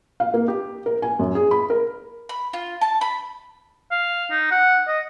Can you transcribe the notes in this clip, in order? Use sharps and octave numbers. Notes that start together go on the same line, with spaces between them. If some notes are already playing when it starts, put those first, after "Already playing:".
F5
A#3
G4
A#4
G#5
F#2
G#4
B5
A#4
B5
F4
A5
B5
F5
D#4
F#5
D#5